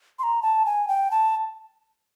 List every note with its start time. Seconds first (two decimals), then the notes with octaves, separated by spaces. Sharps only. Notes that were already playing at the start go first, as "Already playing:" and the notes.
0.19 C6
0.23 A#5
0.42 A5
0.66 G#5
0.88 G5
1.11 A5